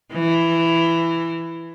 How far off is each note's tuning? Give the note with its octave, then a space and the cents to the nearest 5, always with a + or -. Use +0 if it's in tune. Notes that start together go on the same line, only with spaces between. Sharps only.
E3 +15